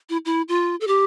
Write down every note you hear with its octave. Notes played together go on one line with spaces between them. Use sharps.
E4
E4
F4
A4
G4